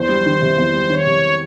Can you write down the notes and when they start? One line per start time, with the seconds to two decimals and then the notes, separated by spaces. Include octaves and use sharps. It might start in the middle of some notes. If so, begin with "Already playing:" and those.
Already playing: E2 C5
0.09 G3
0.26 D#3
0.42 C3
0.58 E2
0.74 G3
0.89 D#3 C#5
1.06 C3